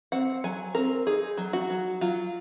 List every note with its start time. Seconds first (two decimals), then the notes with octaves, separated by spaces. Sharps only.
0.12 C4 F#5
0.44 F#3 G#5
0.75 C4 A#4
1.07 D#4 G#4
1.38 F#3
1.53 F#4
1.70 F#3
2.01 F#3 F4